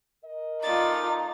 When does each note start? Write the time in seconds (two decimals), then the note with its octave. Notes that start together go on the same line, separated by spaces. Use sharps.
0.25 A#4 D#5
0.63 A3 D#4 F4 D5 A6